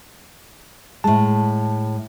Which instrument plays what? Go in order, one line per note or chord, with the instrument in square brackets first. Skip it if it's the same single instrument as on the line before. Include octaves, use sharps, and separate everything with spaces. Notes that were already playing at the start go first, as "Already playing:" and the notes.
[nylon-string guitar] A2 G#3 [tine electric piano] A5